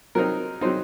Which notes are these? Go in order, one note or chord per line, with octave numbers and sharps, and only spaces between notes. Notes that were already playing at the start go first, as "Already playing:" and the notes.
F#3 C4 D#4 A#4
F#3 C4 D#4 C5